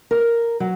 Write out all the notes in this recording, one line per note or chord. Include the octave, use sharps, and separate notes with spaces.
A#4
F#3